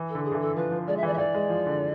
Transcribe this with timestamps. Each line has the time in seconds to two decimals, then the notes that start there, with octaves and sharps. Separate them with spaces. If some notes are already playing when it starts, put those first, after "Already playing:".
Already playing: E3
0.10 A4
0.15 D3
0.25 G#4
0.32 D3
0.35 E3
0.41 A4
0.56 F3 B4
0.71 F3
0.87 G#3 D5
0.97 E5
1.03 E3 D5
1.14 E5
1.18 E3 D5
1.34 G#3
1.49 F3
1.66 D3